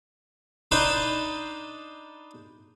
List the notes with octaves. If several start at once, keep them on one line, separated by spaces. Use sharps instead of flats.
D4 D#4 B4 C5 A5 B5